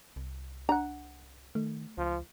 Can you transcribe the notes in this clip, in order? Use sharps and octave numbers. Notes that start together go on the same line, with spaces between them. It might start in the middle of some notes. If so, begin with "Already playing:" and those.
C2
D4 F#5 A#5
D#3 A3
C#2 F3